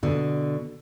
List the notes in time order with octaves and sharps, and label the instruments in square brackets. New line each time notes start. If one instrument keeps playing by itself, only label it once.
[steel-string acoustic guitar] B2 D3